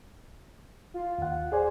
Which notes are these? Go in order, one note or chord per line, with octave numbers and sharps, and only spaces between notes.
F4
D#2 F#5
G#4 C5 D5 G#5